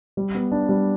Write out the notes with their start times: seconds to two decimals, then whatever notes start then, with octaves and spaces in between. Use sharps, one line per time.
0.17 G3
0.35 B3
0.52 D4
0.69 G3